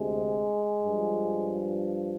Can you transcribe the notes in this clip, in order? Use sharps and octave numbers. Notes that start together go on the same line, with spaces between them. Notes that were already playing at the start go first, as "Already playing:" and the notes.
Already playing: D2 C3 G#3
G2 F3